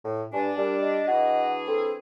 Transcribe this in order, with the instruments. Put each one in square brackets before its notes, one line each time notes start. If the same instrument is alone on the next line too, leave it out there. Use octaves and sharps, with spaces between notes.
[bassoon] A2
[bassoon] G2 [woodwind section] D4 [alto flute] G#5
[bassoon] G3 [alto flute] A#4
[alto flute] D#5
[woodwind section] E3 D4 G#4 [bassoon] F#4
[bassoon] C4 [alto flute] A4